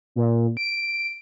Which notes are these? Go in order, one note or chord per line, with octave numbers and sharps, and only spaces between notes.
A#2
D7